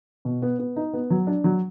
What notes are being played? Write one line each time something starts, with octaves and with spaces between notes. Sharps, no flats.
B2
B3
B3
D#4
B3
F#3
D4
F#3